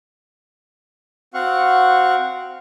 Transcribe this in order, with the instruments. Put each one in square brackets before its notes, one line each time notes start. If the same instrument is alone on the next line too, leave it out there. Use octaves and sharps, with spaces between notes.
[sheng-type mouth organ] C4 F#4 F5 F#5 C#6